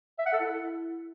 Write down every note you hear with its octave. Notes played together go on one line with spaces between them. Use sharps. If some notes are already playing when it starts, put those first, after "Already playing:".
E5
F#5
A4
E4